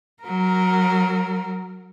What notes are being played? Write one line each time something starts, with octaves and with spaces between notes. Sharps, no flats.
F#3 A#4